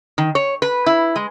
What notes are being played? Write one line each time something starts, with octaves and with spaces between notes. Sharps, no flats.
D#3
C#5
B4
E4
G#3